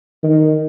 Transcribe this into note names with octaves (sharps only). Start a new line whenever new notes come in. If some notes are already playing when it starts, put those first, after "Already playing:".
D#3